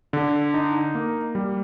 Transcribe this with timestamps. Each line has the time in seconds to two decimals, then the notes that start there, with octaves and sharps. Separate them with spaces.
0.13 D3
0.54 D#4
0.95 A#3
1.35 G3